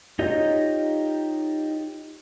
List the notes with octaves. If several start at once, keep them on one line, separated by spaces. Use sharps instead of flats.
D#4 F4 G4 C#5 D#5